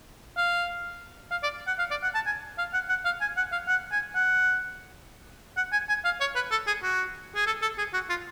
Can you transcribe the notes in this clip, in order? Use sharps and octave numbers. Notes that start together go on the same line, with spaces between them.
F5
F5
D5
F#5
F5
D5
F#5
A5
G#5
F5
F#5
F#5
F5
G#5
F#5
F5
F#5
G#5
F#5
F#5
G#5
G#5
F5
C#5
B4
A4
G#4
F#4
G#4
A4
A4
G#4
F#4
F4